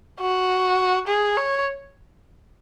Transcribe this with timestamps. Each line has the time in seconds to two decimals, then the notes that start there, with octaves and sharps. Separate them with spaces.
0.21 F#4
1.08 G#4
1.37 C#5